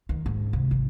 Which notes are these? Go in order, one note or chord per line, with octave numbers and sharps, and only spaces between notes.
D#3
G#2
C3
G#1